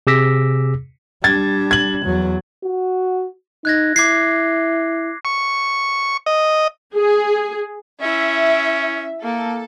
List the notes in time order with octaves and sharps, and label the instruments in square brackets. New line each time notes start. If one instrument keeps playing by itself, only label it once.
[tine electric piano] C3 G#4 D6 E6 A#6 B6
[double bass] G3 D4 [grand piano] G#6 A6
[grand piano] G#6 F#7
[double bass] E2 F#3
[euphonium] F#4
[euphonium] D#4 [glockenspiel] F#6 G#6 A#6
[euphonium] E4 [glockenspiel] D6 G#6 C7
[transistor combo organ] C#6
D#5
[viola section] G#4
[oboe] C#4 [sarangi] E4 [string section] E5
[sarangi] A#3 [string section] A4